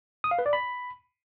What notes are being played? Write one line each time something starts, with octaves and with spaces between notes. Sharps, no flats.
D#6
F5
B4
D5
B5